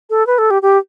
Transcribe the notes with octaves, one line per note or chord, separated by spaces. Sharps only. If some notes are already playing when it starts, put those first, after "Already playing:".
A4
B4
A4
G4
G4